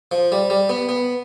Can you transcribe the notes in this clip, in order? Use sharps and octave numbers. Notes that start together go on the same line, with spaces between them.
F3
G3
G3
B3
B3